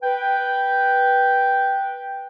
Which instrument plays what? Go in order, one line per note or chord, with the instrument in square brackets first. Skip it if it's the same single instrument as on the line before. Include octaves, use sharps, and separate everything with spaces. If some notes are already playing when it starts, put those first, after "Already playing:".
[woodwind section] B4 G5